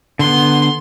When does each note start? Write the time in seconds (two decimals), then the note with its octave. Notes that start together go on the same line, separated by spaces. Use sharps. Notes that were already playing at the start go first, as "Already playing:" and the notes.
0.19 D3 B3 C6